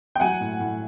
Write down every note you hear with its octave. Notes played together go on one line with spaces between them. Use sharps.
G5
F#3 F#5 G#5
A2
A2